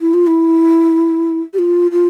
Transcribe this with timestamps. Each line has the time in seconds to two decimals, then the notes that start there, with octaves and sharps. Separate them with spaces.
0.01 E4
0.14 F4
0.27 E4
1.54 G4
1.59 F4
1.91 F4